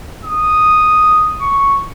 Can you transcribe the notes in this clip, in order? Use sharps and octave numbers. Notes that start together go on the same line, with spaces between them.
D#6
C#6